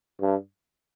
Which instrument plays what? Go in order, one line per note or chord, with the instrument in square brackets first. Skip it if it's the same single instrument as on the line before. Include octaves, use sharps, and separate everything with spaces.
[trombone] G2